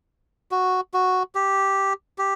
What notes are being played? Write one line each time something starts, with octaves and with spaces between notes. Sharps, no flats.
F#4
F#4
G4
G4